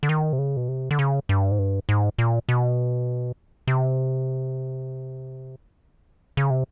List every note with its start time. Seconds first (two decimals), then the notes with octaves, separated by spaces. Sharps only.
0.03 D3
0.09 D#3
0.33 C3
0.39 C#3
0.57 B2
0.69 C3
0.91 D3
0.99 C#3
1.29 G2
1.51 G#2
1.59 G2
1.89 G#2
2.18 A#2
2.49 B2
3.68 C3
6.37 C#3
6.50 C3